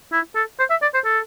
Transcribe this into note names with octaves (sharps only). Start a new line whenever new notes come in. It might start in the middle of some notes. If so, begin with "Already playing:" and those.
E4
A4
C5
E5
D5
C5
A4